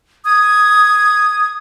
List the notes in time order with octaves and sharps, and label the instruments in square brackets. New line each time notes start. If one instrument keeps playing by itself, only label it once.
[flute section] D#6 G#6